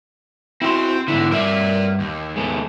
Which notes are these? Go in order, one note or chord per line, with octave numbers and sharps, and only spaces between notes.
C4 E4 F#4 C6
G#2 D3 B3 E4
G2 A#4 D5 E5
D#2
G#3 B3 A4